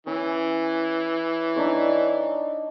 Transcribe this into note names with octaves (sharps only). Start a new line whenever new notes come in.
E3 C#4
D4 D#4 C#5